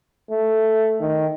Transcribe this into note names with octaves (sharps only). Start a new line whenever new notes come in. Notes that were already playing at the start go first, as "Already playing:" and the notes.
A3
D#3